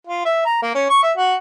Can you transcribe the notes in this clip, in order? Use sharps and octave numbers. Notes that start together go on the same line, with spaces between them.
F4
E5
A#5
A#3
C#4
C#6
E5
F#4